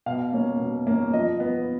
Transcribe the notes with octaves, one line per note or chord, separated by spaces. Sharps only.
B2 F5
A#3 C#4
B2
A#3 C#4
F3 D#5
B3